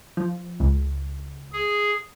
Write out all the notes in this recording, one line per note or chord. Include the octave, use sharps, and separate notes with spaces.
F3
C#2
G#4